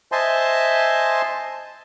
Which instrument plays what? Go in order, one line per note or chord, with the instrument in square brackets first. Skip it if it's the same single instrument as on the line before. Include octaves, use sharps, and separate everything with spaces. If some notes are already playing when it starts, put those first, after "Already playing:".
[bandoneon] C5 D#5 E5 G#5 A5 C6